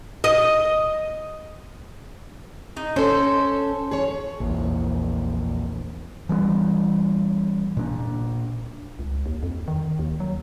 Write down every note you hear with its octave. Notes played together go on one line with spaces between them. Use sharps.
D#5
D#4
C#4 A4 C5
G#4 C#5
A#1 E2
E3 G3 G#3 B3
A#2 D4
C#2
D#2
F2
D#3
D#2
F#3